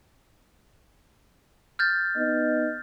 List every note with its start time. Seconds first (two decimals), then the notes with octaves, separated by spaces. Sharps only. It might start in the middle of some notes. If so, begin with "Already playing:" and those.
1.79 F6 G6 A6
2.16 B3 D#4 D#5